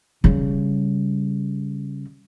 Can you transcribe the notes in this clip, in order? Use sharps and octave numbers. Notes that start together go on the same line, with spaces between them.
C#3 G3